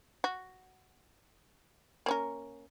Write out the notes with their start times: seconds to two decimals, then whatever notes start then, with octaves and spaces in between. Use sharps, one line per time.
0.24 F#4
2.06 A#3 C#4 A#4